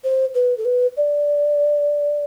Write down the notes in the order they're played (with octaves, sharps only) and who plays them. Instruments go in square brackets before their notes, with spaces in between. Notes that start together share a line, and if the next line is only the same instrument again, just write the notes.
[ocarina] C5
B4
A4
B4
D5